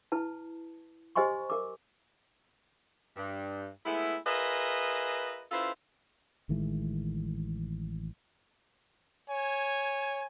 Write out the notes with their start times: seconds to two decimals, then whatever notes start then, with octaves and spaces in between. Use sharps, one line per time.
0.12 E4 B4 A5
1.16 G4 C5 D#5 G#5 C6 C#6
1.50 A#4 D6
3.16 G2
3.85 G#3 A3 B3 E4
4.26 F4 G#4 A#4 B4 D#5 E5
5.51 C#4 E4 F4 A4 B4 C5
6.49 A1 D#3 E3 G#3
9.28 C#5 G#5